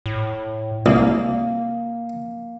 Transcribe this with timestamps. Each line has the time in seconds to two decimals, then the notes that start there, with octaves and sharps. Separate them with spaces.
0.06 A2
0.86 C2 A#3